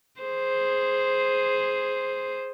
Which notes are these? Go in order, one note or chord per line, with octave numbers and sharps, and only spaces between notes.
G#4 C5